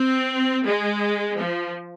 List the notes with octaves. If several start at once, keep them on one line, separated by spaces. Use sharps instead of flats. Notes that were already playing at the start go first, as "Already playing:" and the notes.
Already playing: C4
G#3
F3